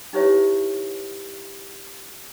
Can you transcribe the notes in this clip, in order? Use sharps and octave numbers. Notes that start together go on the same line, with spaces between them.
D#4 E4 G4 B4 C#5 E5